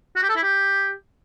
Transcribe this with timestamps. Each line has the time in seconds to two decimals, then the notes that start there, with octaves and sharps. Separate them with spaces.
0.16 F#4
0.23 G4
0.29 A4
0.36 E4
0.43 G4